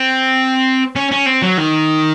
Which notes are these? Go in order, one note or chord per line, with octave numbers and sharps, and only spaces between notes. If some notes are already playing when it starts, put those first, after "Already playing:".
Already playing: C4
C#4
C#4
C4
F#3
D#3